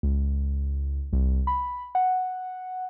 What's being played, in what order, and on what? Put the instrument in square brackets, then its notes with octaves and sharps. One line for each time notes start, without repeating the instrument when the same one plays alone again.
[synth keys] C#2
C2
B5
F#5